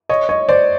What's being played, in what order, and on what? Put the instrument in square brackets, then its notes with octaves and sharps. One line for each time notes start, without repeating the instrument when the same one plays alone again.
[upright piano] C#5 D#5
C#5 D#5
C5 D5